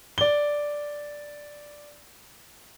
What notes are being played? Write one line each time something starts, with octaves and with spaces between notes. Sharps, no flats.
D5 G7